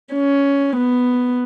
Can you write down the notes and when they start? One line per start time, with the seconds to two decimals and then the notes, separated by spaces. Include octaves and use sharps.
0.14 C#4
0.76 B3